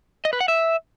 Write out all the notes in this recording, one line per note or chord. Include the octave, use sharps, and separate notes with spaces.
D#5
B4
F#5
E5